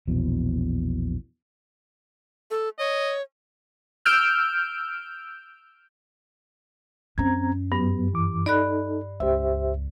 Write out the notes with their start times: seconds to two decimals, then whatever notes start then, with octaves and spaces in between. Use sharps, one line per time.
0.08 A#1 E2 B2
2.51 A4
2.79 C#5 D#5
4.05 E6 F6 G6 D7
7.18 F#2 C4 C#4 A#5 G#6
7.72 G2 F#3 B3
8.13 E3 D6
8.46 D#4 A4 D5 B5 F#6
9.20 C#2 G4 C5 E5